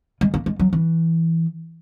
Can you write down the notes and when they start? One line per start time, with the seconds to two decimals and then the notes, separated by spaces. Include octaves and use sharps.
0.21 G#3
0.34 A#3
0.46 G#3
0.59 F#3
0.73 E3